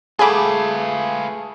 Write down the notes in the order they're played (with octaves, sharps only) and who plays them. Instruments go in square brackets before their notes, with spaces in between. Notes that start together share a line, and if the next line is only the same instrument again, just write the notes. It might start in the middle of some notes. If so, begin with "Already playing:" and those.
[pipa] F#3 A3 [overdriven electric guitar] F4 B4 [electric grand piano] G#4 [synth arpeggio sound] G#5 B5 D6